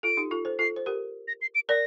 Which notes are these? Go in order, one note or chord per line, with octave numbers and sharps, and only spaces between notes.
F4 A4 D7
D#4 G4
F4 A4
A4 C5
F4 A4 C7
C5
G4 A#4
A#6
C7
D7
A#4 D5 A#6